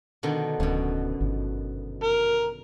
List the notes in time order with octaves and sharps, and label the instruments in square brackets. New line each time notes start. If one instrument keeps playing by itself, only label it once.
[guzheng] B2 D3 D#3
[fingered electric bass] D1 [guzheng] F#2 B2
[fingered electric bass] G1
[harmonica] A#4